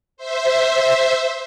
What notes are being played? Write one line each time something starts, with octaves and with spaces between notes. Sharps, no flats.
C5 E5